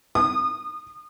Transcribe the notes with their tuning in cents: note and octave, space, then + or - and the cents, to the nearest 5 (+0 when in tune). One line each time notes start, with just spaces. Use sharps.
D#6 -30